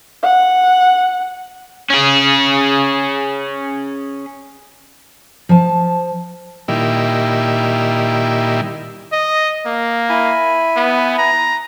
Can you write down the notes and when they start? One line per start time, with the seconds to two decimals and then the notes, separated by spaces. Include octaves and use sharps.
0.23 F#5
1.90 C#4 G#4
5.49 F3 A5
6.68 A#2 D#3 G3 E4
9.12 D#5
9.66 A#3
10.09 E4 G#5 B5
10.76 B3
11.18 A#5